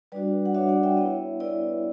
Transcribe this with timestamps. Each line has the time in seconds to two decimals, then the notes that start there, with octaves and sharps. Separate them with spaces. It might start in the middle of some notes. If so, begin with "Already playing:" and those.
0.12 G3 D4 F#4 B4 D5
0.45 F#5
0.55 G3 D4 F#4 C#5 E5
0.69 D5 F#5
0.83 E5 G5
0.97 B3 E4 C#5 E5
1.40 B3 E4 B4 D5